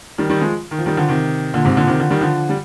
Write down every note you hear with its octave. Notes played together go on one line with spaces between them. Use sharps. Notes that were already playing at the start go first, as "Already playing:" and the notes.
D#3 G3
D#3 G3
F3 G#3
D#3
F3
D#3 G3
D3 F3
C3 D#3
A#2 D3
G#2 C3
A#2 D3
F3
C3 D#3
D3 F3
D#3 G3
D3 F3
G3